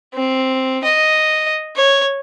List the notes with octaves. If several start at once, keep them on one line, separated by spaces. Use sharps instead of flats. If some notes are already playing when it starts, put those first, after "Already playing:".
C4
D#5
C#5